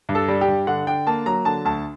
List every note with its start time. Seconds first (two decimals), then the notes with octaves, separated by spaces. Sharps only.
0.09 G2
0.15 A4
0.28 G3
0.41 G4
0.48 G2
0.67 D3 F#5
0.87 D3 G5
1.07 A#3 A5
1.26 F#3 A#5
1.45 D3 A5
1.65 D2 A5